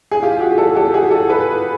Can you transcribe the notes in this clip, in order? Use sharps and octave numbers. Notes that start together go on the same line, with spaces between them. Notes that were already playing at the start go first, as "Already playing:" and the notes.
G#4
F4 G4
F#4 G#4
G4 A4
G4 A4
F#4 G#4
G4 A4
A4 B4